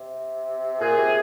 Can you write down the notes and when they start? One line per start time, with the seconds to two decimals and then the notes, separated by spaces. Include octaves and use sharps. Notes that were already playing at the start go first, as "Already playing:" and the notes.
Already playing: C3
0.81 A#2 G#4
0.97 C3